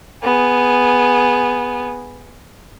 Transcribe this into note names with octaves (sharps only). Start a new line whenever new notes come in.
B3 G#4